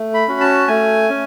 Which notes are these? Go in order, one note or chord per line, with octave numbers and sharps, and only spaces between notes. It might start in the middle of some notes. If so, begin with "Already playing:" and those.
Already playing: A3
B5
C#4 F#4
A5
A3 G#5
C#4